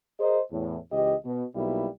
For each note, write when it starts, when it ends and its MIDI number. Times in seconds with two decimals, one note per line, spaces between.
0.20 0.40 68
0.20 0.40 70
0.20 0.40 72
0.20 0.40 75
0.52 0.78 40
0.52 0.78 45
0.92 1.15 37
0.92 1.15 52
0.92 1.15 67
0.92 1.15 75
1.25 1.44 47
1.55 1.87 35
1.55 1.87 47
1.55 1.87 55
1.55 1.87 58
1.55 1.87 64